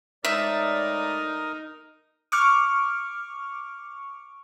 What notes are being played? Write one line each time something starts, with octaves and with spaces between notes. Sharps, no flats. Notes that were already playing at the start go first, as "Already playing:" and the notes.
A2 G#3 D#4 A#4 D5 E5 D#6
C#6 D6 F6